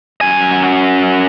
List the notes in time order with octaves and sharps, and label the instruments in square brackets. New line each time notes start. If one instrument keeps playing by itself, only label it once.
[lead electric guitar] F#2 G#5